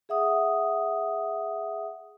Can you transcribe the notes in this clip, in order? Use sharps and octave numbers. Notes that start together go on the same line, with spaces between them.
G#4 E5 F#5 D#6